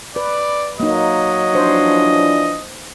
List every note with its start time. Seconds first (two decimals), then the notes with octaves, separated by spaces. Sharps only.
0.16 B4 D5
0.80 F#3 A#3 D#4 D#5
1.55 E3 F3 D4 C5